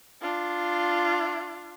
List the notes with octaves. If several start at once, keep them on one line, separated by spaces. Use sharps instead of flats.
D4 F4